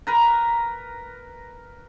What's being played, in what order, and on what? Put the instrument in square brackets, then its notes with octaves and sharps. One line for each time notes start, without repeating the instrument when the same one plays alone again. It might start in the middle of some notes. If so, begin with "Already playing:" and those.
[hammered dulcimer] A#4 B4 A#5